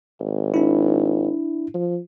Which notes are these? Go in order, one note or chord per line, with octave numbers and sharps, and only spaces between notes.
G#1
D4 E4
F3